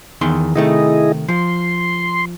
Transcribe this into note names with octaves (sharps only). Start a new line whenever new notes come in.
E2 D#3 C6
C3 D#3 A3 E4 G#4 D#5
F3 C6